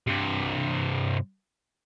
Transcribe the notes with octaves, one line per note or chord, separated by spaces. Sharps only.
G2 C3